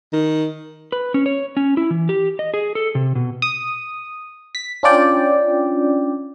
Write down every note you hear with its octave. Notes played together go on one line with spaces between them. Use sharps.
D#3
B4
C#4
C#5
C#4
E4
E3
G4
D#5
G#4
A4
C3
B2
D#6
B6
C#4 D4 F4 D5 G5